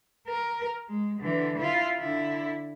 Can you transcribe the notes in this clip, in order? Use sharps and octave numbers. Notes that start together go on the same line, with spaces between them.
A#4
G#3
D3 E3
E4 F4
D3 E4